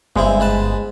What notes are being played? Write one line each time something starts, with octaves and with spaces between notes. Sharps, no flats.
G1 G2 G#3 C4 E4
G#2 B4 A5